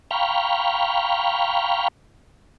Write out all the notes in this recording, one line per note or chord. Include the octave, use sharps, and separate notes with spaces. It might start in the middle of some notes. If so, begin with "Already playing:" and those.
F5 G5 A#5 B5 C#6 F6